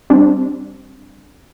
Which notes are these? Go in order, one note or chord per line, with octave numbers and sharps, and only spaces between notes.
G3 C4 D4